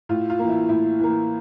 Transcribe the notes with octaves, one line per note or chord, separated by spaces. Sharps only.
A2 F4
F4
E3 A#3
E4
A2 E4
E3 A#3